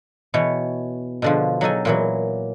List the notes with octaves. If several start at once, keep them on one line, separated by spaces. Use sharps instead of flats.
B2 E3 C#5
B2 D3 F3
F#3 D#4 A4 G#5
A#2 E3 F#3